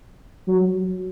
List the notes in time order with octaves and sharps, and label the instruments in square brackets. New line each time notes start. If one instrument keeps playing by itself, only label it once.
[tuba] F#3